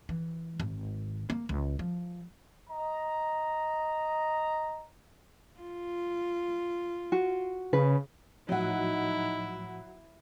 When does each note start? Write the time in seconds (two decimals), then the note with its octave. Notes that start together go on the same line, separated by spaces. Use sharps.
0.09 E3
0.60 G#1
1.30 A#3
1.49 C#2
1.79 F3
2.70 D#5 A#5
5.60 F4
7.12 F#4
7.73 C#3 B4
8.49 A2 F3 F#3 D#4 E4 F#4